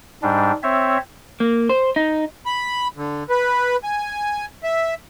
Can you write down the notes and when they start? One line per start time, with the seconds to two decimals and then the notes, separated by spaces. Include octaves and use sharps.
0.23 G#2 G3 D4
0.63 C4 C#5 E5
1.40 A#3
1.69 C5
1.96 D#4
2.46 B5
2.96 D3
3.30 B4
3.84 G#5
4.63 E5